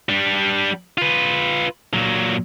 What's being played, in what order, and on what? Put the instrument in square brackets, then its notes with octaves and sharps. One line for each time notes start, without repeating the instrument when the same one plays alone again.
[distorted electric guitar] G3 D4
F4 B4
A#2 F#3